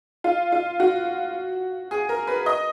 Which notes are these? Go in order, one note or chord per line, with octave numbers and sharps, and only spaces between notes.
F4
F4
F#4
G#4
A#4
B4
D#5